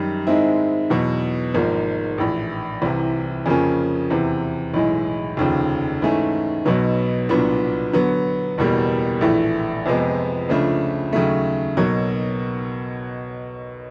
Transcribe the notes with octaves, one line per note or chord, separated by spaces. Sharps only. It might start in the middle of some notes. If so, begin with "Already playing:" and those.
Already playing: F#2 D#3 G3
G#2 D#3 G#3 C4 E4
E2 B2 F#3
G#1 G#2 F3 A#3
A#1 A2 E3
C2 C3 E3
F2 C#3 F3 A#3 C#4
E2 C3 E3
B1 A2 E3 G#3
F1 D#2 C#3 F3
G#2 E3 A3 C#4
B1 B2 F#3 B3
C2 A#2 F#3 B3 D4
D3 F#3 B3
F#1 E2 B2 G3 A#3
A#1 A2 E3 A3
F2 C3 F3 G#3 B3
C#2 C#3 F3 A3 D4
D#2 C#3 F#3 A3
B1 B2 F#3 A#3